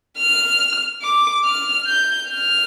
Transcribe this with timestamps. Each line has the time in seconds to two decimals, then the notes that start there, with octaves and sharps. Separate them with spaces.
0.18 F6
1.02 D6
1.45 F6
1.87 G6
2.29 F6